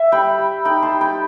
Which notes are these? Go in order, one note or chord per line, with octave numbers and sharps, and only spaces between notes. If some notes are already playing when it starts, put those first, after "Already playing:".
Already playing: E5
G3 G5 B5
G3
D#4 G5 B5
A5 C6
G3
G5 B5